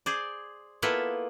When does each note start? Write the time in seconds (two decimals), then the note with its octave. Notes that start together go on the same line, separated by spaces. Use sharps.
0.06 G#4 C5 D5
0.82 A#3 B3 E4 F4 A4 B4